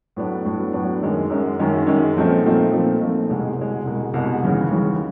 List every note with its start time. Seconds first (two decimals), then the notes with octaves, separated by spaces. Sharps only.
0.16 A2 F#3 B3 D4
0.45 A2 F#3 B3 D4
0.73 A2 F#3 B3 D4
1.02 F#2 D#3 G#3 C#4
1.30 F#2 D#3 G#3 C#4
1.59 F#2 D#3 G#3 C#4
1.87 F#2 D#3 G#3 C#4
2.15 A#2 F3 A3 C4 D#4
2.43 A#2 F3 A3 C4 D#4
2.72 A#2 F3 A3 C4 D#4
3.00 A#2 F3 A3 C4 D#4
3.30 C2 B2 G#3
3.58 C2 B2 G#3
3.85 C2 B2 G#3
4.14 C2 B2 G#3
4.43 D#2 C#3 E3
4.71 D#2 C#3 E3